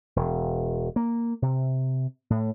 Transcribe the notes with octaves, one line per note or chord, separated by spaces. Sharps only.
E1
A#3
C3
A2